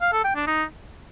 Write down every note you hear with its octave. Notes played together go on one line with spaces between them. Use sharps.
F5
A4
G5
D4
D#4